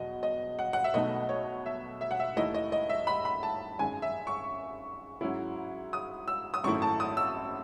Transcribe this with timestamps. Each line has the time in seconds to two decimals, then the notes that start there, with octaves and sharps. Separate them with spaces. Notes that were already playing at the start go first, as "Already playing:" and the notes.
Already playing: E2 B2 F#3 D#5
0.23 D#5
0.59 F#5
0.73 F#5
0.84 E5
0.94 B1 B2 A3 D#4 D#5
1.29 C#5
1.66 E5
2.01 E5
2.11 F#5
2.20 E5
2.36 D#2 D#3 A3 E4 D#5
2.54 D#5
2.72 D#5
2.89 E5
3.07 B5
3.25 B5
3.43 A5
3.78 G#1 F#2 D#3 G#3 D#4 G#5
4.02 E5
4.27 C#6
5.21 G#2 F#3 C#4 E4
5.93 D#6
6.28 E6
6.54 D#6
6.63 G#1 F#2 D#3 A3 E4 C#6
6.82 A5
7.00 D#6
7.17 E6